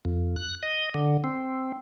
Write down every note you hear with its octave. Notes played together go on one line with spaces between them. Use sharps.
F2
F#6
D#5
D3
C4